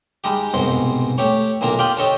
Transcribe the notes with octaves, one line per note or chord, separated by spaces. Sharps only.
G3 G#3 D#4 G4
C2 G#2 B2 C6
A3 G4 C#5
B1 A#2 D#3 D4 A#5
G4 D5 F5 G5 C6 D#6
D4 G4 A4 C#5 D#5 G5